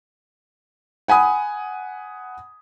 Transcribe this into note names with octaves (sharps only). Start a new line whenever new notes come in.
F#5 G#5 B5 D#6